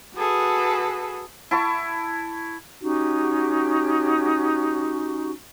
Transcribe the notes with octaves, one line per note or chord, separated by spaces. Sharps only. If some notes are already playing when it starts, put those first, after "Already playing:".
F#4 G#4 A4 B4
E4 A5 C#6
C#4 D#4 F#4 G4